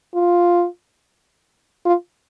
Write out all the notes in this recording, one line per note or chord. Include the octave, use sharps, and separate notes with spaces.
F4
F4